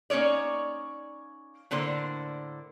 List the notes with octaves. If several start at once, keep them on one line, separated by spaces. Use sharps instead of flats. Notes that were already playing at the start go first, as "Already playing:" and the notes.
A#3 C#4 D#4 C#5 D5
A2 D3 A#3 C5